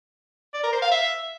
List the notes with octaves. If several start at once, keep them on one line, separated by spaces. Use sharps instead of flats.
D5
A#4
C5
F5
E5